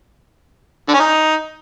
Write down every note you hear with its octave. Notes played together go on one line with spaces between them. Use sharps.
D3
C#4
D#4